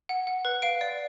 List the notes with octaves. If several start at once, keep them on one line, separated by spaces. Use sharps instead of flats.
F#5
F#5
B4
F5 D7
D5